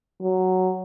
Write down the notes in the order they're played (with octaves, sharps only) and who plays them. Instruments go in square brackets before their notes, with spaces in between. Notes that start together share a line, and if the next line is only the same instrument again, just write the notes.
[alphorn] F#3